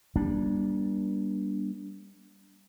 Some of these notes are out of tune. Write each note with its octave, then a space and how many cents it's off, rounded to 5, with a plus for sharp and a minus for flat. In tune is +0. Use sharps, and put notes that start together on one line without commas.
G3 +0 A#3 +45 D4 +0